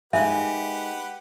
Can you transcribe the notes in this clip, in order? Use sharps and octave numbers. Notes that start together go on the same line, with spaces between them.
G#3 A#3 D#4 G4 B4 E5 F#5 G#5